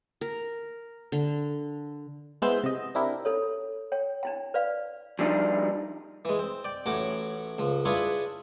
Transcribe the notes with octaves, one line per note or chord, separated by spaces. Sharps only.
A#4
D3
G#3 B3 E4 C5 E6 G6
C3 D#5
C4 D4 E4 G4 A#4
D#4 A4 C#5
C#5 G5
D4 E4 G5
B4 D5 F5
F3 G3 D4 D#4
E3 G#3
C4
D5 G5
A1 A2 C#4 F#4 D6
C#2 F3
D4 E4 F4 G#4 B4 C#5